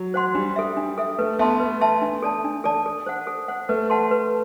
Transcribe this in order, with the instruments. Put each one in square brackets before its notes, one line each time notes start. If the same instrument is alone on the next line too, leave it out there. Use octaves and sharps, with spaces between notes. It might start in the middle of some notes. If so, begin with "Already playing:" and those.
Already playing: [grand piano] F#3
[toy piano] C5 F#5 C6
[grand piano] G3 [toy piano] D4
[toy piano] A4 E5
D4
A4 E5
[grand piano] A3 [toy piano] B4
[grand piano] B3 [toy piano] E5 A5 C6
[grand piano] A3 [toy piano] B4
[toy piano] E5 A5 C6
D4
A4 D5 A5
D4
A4 D5 A5
A4
C5 F#5
A4
C5 F#5
[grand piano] A3 [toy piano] B4
[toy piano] F#5 A5 C6
B4